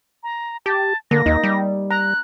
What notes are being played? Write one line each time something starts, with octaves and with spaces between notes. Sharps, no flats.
A#5
G4 A5
D3 A#3 A#6
D#2 D#4
G3
A#5 F#6